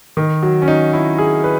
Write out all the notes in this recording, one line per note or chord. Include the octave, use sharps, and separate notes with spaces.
D#3
F#3
C#4
D#4
E4
G#4
B4